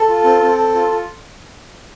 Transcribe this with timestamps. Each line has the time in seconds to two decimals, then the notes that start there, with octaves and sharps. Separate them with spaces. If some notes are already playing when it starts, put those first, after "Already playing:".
Already playing: A4
0.08 F4
0.24 C4
0.42 C4
0.57 A4
0.74 F4
0.91 F4